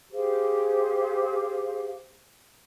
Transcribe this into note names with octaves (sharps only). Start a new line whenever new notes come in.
G4 G#4 C5 F5